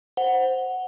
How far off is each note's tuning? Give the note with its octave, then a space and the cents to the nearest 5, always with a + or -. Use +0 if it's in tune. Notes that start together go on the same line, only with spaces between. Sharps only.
C5 +0 F#5 +0